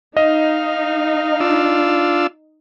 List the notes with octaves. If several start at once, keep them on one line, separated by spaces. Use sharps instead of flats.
D#4 D#5 F5
D4 F4 E6